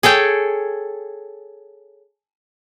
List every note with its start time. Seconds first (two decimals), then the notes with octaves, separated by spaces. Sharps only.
0.03 G#4 A4 C#5 G5